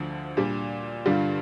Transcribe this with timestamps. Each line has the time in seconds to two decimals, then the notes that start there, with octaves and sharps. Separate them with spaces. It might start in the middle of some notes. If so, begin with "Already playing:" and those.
Already playing: D2 D3 F3
0.37 A#2 G3 D4
1.06 G2 D3 G3 D4 F4